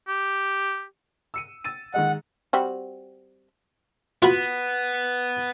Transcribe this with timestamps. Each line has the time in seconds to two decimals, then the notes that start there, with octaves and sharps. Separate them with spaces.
0.08 G4
1.34 E6 C#7 D#7
1.64 E6 A6 D#7
1.94 D#3 G#3 D#5 F#5
2.53 G3 C4 F#4
4.23 B3 F4 F#4 B5